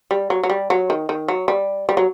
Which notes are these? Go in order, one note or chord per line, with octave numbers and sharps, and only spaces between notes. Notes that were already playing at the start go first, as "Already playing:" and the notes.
G3
F#3
F#3
G3
F#3
D#3
D#3
F#3
G3
G3
F#3